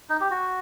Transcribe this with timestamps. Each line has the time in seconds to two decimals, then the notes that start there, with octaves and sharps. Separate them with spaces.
0.10 D#4
0.21 G4
0.31 F#4